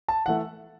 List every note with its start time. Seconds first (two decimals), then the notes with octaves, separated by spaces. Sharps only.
0.08 A5
0.26 E3 A3 F#5